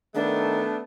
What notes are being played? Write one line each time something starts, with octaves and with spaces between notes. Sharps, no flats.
D#3 A3 B3 D4